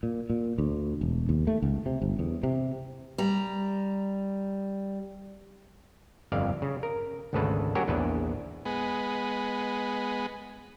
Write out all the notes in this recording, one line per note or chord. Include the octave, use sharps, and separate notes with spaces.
A#2
A#2
D2
E1
D#2
A3
C#2
C3
G1
E2
C3
G3 A#5
G1 F2 D5 F5
C#3
A#4
G#1 D2 C#3 A4 B4 A5
F#3 C#4 F#4 G4 A#4 C#5
A#1 E2 D4 B4 A5
G#3 B3